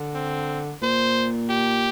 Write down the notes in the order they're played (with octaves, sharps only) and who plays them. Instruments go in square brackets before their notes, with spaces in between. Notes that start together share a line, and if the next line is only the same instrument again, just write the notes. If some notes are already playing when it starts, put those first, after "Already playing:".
Already playing: [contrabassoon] D3
[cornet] C4
[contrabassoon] A#2 [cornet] C5
[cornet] G4